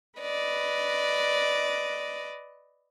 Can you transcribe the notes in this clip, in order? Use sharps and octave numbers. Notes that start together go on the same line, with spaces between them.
B4 D5 D#5